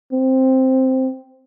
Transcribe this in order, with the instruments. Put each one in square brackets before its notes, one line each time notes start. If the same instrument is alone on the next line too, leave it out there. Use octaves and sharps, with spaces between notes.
[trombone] C4